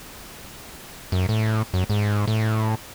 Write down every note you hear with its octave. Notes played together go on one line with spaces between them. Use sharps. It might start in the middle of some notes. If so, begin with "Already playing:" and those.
F#2
A2
F#2
G#2
A2